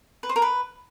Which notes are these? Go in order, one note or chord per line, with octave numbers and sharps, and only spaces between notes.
B4
C5
A#4
B4